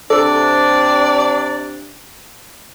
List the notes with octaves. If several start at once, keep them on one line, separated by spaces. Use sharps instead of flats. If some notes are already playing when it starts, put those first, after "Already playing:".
C3 D4 A4 D5